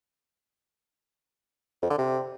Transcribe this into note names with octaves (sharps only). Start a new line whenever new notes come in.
F2
D3
C3